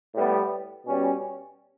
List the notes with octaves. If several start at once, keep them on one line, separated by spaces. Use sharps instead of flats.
A2 G3 B3
B2 G3 C#4